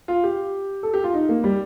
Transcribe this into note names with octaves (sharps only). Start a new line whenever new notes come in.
F4
G4
A4
G4
F4
D#4
A#3
G3